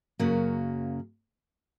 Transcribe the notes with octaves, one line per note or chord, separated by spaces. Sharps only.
F#2 C#3 F#3 A#3